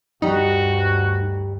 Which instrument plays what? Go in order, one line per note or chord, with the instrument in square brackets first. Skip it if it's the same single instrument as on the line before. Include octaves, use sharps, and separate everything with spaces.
[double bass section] D2 G2 [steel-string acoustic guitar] G3 A#5 [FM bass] D#4 [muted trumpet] F#4